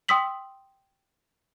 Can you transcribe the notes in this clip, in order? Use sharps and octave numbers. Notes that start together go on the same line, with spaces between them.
G5 C6 D#6 E6 B6 F#7